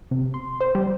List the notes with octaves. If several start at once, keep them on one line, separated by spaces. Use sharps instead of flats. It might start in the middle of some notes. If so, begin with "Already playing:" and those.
C3
C6
C5
G3